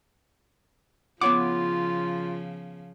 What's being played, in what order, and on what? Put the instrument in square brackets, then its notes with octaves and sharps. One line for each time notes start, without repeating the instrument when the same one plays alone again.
[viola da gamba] C#3 F3 [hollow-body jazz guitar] B3 C#5 F#5 [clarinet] F4 [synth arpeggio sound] D6